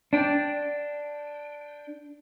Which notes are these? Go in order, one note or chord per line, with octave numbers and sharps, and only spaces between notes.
D4 G5